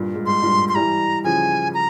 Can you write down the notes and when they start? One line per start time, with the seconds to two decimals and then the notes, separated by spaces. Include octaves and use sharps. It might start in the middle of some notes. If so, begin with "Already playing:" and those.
Already playing: G2 A#2
0.14 G#2
0.26 G#2 C6
0.42 G2 A#2
0.69 C6
0.75 E3 G3 A#5
1.24 C#3 F3 G#5
1.74 A#5